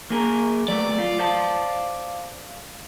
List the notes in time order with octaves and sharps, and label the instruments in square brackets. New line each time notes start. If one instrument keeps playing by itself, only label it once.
[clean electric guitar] A#3 G#4 A#4
[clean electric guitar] F#3 A3 B3 [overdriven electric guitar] D5
[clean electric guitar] F4
C5 F5 A5